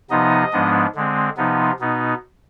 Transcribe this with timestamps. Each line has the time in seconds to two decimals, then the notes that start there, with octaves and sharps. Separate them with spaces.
0.10 C3 F3 B3 D#4 D#5
0.53 G#2 F3 G#3 B3 D4
0.95 D3 G#3 C4
1.37 C3 F3 B3 D#4
1.79 B2 B3 D#4